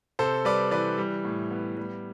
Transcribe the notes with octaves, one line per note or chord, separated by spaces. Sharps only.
C3 A4 C5
G3 B4 D5
E3 B4 D5
G3
A2
B3
G3